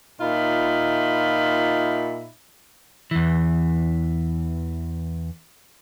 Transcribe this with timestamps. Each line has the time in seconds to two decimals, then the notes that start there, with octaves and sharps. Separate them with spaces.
0.21 A#2 D#4 F4 E5 B5
3.11 E2 E3